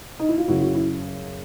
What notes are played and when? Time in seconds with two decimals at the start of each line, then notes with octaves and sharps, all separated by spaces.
0.20 D#4
0.29 E4
0.38 F4
0.48 F#2 C#3 F#3 E4 F#4
0.61 E4 F#4
0.75 E4